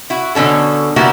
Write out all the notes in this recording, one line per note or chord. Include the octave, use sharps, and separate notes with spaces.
E4 F#4
B2 D3 C#4 A4
D3 A#3 B3 E4 F#4 G4